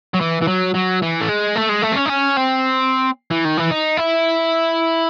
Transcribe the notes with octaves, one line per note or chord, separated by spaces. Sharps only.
F#3
E3
E3
F#3
F#3
E3
A3
G#3
A3
G#3
A3
C4
C#4
D#4
C#4
C4
E3
D#3
E3
D#4
E4